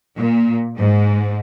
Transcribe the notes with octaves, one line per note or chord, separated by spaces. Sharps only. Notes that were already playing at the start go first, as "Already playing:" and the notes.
A#2
G#2